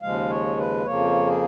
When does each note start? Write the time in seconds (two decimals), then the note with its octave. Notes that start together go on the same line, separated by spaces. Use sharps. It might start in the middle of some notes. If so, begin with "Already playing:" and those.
0.02 D#2 C#3 F3 G#3 F5
0.29 C#5
0.57 B4
0.85 F2 C#3 F3 A#3 C#5
1.26 G#4